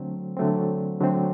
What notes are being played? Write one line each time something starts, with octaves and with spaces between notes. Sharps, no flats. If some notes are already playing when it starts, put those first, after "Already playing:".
Already playing: D3 F#3 A3 C4
D3 F#3 A3 C4
D3 F#3 A3 C4